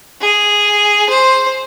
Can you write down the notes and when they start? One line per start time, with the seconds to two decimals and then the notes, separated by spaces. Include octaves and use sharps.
0.21 G#4
1.09 C5